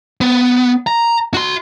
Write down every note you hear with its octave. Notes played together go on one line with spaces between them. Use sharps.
B3
A#5
F#4 C6